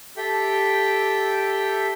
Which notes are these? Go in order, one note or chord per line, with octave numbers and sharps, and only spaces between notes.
G4 A4 E5 G5